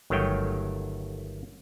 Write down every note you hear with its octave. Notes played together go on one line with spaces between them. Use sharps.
G1 D#3 F#3 A3 C#5 G5